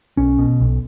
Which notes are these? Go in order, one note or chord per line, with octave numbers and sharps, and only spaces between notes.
B1 C#4
B2
B1